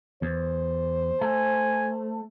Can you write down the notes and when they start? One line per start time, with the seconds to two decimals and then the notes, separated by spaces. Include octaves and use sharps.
0.22 E2 C5
1.21 A3 G#5